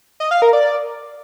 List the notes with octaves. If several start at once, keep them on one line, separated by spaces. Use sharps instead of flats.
D#5
F5
A#4
D5